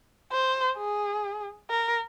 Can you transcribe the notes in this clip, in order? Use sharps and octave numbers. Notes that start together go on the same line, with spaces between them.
C5
G#4
A#4